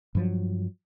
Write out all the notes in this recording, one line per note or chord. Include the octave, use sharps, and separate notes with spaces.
G2 F3 F#3